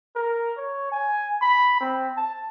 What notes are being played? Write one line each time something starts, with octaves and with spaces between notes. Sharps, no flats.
A#4
C#5
G#5
B5
C4
A5